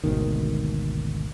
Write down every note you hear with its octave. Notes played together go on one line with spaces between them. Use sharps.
G#1 D2 B2 D#3